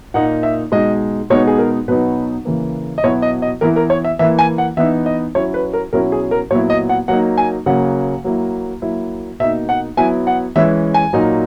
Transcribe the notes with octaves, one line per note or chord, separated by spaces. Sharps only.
A#2 A#3 D#4 F#5
E5
B2 G#3 D#4 D#5
B2 G#3 B3 D#4 C#5
G#4
A#4
B2 F#3 B3 D#4 B4
C#3 E3 A#3
D#5
B2 F#3 B3 E4 C#5
D#5
D#5
E3 B3 E4 A#4
A#4
C#5
E5
E3 A#3 E4 E5
G#5
F#5
E3 B3 D#4 E5
D#5
F#3 C#4 E4 C#5
B4
A#4
B2 F#3 C#4 E4 A#4
G#4
A#4
A#2 F#3 B3 E4 C#5
D#5
F#5
F#3 A#3 D#4 F#5
G#5
C#3 F#3 A#3 F#5
F#3 A#3 E4
F#3 A#3 E4
B2 A#3 D#4 E5
F#5
F#3 B3 E4 G#5
F#5
E3 G#3 C#4 E4 E5
G#5
A#2 F#3 A#3 D#4